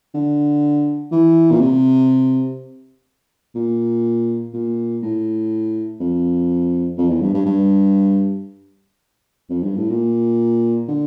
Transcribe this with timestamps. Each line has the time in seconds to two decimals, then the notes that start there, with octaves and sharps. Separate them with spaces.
0.14 D3
1.11 E3
1.51 A#2
1.61 C3
3.55 A#2
4.54 A#2
5.03 A2
6.00 F2
6.98 F2
7.10 E2
7.22 G2
7.34 G2
7.46 G2
9.50 F2
9.63 G2
9.77 A2
9.90 A#2
10.88 D3